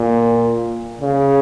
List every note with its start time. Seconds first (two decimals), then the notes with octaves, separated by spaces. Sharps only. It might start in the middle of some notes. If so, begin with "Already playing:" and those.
Already playing: A#2
1.00 C#3